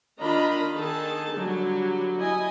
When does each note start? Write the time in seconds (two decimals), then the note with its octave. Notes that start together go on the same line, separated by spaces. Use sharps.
0.19 D#3 D4 F4 D#5 A#5 B5
0.76 D#3 D#4 G#4 A4 A5
1.36 D3 F#3 G3
2.18 E4 D#5 G#5